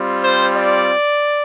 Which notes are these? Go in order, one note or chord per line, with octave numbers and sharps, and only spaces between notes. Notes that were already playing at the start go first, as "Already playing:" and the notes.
Already playing: G3 C4 F4
C5
D5